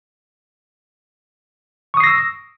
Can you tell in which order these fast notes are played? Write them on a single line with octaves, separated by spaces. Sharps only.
C#6 D#6 C7 A#6 E6